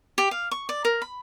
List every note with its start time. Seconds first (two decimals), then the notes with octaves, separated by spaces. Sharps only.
0.18 G4
0.31 F5
0.51 C#6
0.69 D5
0.85 A#4
1.02 B5